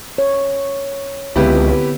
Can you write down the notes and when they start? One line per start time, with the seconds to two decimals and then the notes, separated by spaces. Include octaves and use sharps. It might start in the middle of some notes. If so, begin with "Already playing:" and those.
0.18 C#5
1.36 C#2 D3 B3 C4 E4 G4 B4